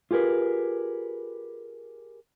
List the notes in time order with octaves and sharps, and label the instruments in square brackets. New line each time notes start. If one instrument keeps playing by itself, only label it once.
[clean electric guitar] F4 G4 G#4 A#4 B4